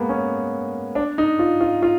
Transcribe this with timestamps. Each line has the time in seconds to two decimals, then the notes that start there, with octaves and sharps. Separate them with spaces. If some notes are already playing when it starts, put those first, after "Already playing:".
Already playing: G#3 A#3 B3
0.09 C#4
0.95 D4
1.18 D#4
1.39 F4
1.61 F4
1.82 F4